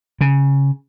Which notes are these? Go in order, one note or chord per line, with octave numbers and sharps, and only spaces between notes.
C#3